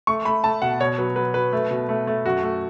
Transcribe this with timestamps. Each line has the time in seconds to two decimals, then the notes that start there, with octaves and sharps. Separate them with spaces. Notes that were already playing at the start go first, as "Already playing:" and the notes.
0.07 A3 C#6
0.25 A3 B5
0.44 A3 A5
0.62 B2 F#5
0.80 B2 C#5
0.98 F#3 B4
1.16 F#3 B4
1.34 F#3 B4
1.53 A3
1.71 B2
1.89 A3
2.07 A3
2.25 F#2 F#4
2.43 A3